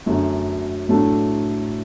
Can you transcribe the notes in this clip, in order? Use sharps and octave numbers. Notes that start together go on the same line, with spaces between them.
F#2 D3 A3
A2 F#3 A3 D4 A4